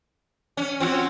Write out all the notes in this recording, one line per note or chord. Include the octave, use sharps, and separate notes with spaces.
C#4
C4 C#4 F4 F#4